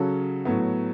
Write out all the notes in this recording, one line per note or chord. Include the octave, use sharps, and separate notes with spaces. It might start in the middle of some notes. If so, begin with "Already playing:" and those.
Already playing: C#3 F#3 C#4 F#4 A4
A2 F#3 B3